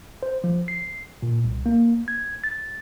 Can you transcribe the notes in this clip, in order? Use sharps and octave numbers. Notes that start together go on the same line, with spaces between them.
C5
F3
C7
A#2
C2
A#3
G#6
A6